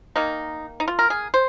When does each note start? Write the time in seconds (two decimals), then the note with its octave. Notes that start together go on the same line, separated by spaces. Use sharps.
0.16 D#3 A#3 D#4
0.80 D#4
0.88 F4
0.99 A#4
1.10 G#4
1.34 C5